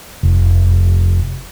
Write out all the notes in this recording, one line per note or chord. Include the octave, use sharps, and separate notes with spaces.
F1